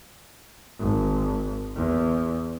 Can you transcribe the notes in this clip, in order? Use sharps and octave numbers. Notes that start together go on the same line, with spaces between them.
G#1
E2